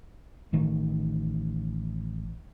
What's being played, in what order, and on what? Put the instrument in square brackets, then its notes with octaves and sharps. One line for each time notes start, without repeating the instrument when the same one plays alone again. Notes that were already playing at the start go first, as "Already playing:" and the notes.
[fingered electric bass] A1 D#3 A3